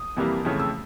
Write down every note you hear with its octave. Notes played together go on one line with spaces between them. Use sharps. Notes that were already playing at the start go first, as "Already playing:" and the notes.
Already playing: D#6
F2 C3 E3 G3 A#3
F2 C#3 E3 A3
E6